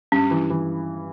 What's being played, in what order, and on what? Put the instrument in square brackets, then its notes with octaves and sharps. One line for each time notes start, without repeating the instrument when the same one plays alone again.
[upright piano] G2 [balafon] C#4
[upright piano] E3
E3